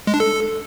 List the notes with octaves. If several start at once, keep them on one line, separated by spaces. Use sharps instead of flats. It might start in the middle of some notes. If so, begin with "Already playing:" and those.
G#3
D4
A4